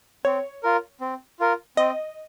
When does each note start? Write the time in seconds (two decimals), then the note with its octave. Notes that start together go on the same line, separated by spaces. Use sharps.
0.25 C4 C#5
0.63 F4 A#4
1.01 C4
1.40 F4 A#4
1.77 C4 D#5